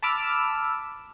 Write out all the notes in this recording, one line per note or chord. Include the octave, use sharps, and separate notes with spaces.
A5 B5 D6 E6 F6